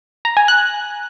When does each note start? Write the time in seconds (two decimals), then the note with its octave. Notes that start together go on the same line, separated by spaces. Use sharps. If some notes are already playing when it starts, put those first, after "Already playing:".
0.25 A#5
0.37 G#5
0.48 F#6